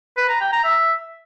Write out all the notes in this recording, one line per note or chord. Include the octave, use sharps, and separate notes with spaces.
B4
A#5
G5
A#5
E5